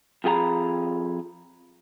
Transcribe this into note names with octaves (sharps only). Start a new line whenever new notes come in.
F2 F3 G#4 G5 A#5 B5